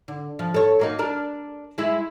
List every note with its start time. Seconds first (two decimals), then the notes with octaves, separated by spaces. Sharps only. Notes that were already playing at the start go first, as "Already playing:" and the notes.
0.08 D3
0.39 F3
0.54 A4 C#5
0.79 F#3 A#3 D#4
0.99 D4 A#4
1.78 G#3 E4